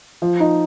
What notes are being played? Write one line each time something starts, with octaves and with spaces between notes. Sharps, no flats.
F3
D#4